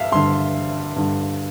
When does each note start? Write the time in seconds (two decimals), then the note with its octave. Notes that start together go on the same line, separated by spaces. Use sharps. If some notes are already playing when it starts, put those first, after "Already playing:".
Already playing: G2 E5 F5
0.12 G2 D3 C6
0.96 G2 D3